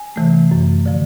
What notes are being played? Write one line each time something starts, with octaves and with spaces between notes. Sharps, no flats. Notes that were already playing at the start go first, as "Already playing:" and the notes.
Already playing: G#5
C3 E3 A3
F#2
D3 F3